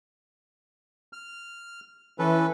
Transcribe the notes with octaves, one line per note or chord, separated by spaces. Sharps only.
F6
E3 C#4 A4 B4